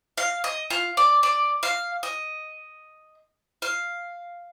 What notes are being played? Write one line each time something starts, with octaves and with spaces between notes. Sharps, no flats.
F5
D#5
F4
D5
D5
F5
D#5
F5